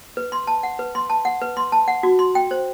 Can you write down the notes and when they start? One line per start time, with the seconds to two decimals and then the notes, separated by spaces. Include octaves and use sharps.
0.17 B4
0.32 C6
0.47 A5
0.63 F#5
0.79 B4
0.95 C6
1.10 A5
1.25 F#5
1.42 B4
1.57 C6
1.72 A5
1.88 F#5
2.03 F#4
2.19 C6
2.35 G5
2.51 C5